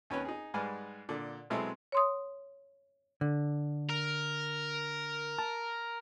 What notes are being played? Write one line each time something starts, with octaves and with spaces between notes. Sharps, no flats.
D#2 C#4 B4 C#5
D#4 G#4
G#2 G3 G#3 B4 G#5 F6
A#2 D3
B2 F#3 G#3 C4 E4 A4
C#5 C6 D#6
D3
A#4
A5